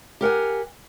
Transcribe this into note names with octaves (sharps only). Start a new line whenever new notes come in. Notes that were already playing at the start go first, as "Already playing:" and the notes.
G4 A#4 F#5 G#5